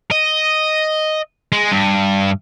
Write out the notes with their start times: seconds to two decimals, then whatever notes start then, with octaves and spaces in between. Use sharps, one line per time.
0.11 D#5
1.52 G#3
1.72 G2